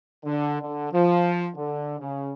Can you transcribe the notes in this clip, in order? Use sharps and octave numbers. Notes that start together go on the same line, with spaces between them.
D3
D3
F3
D3
C#3